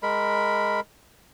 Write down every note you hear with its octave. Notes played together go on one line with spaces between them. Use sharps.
G#3 A#4 B5